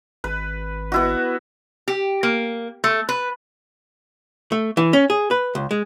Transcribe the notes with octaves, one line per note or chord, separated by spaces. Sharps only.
G#1 B4
B3 E4 F#4
G4
A#3
A3
B4
A3
E3
C#4
G#4
B4
C#2
G#3